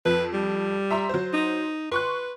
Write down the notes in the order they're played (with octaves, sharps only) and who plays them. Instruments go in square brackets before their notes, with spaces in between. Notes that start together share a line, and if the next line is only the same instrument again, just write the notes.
[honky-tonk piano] F2 [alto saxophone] B4
[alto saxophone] G3
[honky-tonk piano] E5 A#5 C6
F#3 C5
[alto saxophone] D#4
[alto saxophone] B4 [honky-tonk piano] C6 C#6 F#6